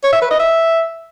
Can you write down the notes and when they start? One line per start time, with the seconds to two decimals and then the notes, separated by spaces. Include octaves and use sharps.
0.04 C#5
0.13 E5
0.22 B4
0.31 D#5
0.40 E5